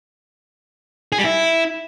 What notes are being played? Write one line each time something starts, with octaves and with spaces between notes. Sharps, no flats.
G#4
G3
E4